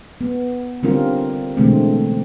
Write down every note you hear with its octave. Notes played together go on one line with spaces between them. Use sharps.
B3
D3 G3 C4 C#4 F4 A#4
B2 D3 E3 G#3 A3 C4